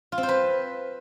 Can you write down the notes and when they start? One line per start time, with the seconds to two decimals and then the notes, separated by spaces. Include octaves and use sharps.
0.12 F4
0.18 C4
0.23 C5
0.29 B4